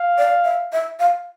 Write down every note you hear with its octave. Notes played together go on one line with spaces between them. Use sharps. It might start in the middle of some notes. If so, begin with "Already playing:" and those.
Already playing: F5
D5
E5
E5
F5